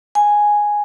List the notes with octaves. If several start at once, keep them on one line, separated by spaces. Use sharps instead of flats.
G#5